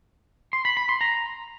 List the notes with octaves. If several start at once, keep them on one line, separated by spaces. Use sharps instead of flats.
C6
B5
B5
C6
A#5